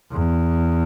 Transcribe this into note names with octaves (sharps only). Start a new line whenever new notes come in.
E2